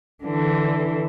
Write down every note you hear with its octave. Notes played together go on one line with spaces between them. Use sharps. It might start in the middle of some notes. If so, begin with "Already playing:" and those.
D3 E3